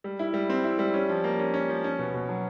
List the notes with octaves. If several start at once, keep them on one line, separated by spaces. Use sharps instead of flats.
G3
E4
G3
C4
E4
G3
C#4
F3
A#3
C#4
C#4
F3
C#4
B2
B2
F#3